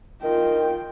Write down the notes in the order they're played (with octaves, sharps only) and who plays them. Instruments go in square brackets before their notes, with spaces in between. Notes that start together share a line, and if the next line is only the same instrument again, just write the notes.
[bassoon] D#3 [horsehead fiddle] F4 G5